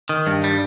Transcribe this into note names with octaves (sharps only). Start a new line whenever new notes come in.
D#3
G2
G3